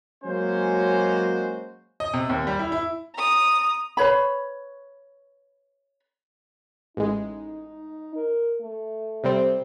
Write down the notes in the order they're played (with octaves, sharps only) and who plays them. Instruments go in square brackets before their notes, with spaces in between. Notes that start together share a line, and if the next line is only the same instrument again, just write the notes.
[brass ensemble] F#3 G#3 A#3 C#4 F#4 C5
[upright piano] D#5
C3
D#2
G3
E4
E4
[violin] A#5 D#6
[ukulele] B4 C#5 B5
[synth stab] A1 G#3 [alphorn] D#4
[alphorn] A#4
A3
[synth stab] C3 G3 C4